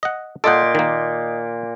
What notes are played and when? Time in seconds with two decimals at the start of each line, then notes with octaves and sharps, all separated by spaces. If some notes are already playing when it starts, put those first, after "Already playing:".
0.03 D#5 F#5
0.44 A#2 A4 D#5 F#5 C6 D6 D#6 G6
0.75 D#3 A#3